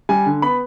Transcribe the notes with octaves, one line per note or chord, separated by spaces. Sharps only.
G3 G#5
D3
B3 B5